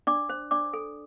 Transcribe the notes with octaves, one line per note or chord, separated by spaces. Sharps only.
D4 D5 D6
C5
D4 D5 D6
A4